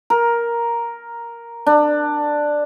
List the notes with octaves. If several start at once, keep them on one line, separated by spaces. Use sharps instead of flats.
A#4
D4